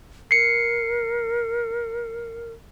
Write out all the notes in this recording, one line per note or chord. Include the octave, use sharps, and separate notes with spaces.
A#4 C7 C#7